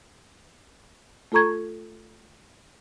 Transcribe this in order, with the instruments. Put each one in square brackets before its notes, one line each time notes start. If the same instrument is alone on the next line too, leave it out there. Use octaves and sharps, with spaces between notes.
[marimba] A3 F4 A4 A#5 C#6 G#6